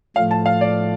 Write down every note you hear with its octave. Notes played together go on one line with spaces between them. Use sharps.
A2 F3 A3 F5
A5
F5
D5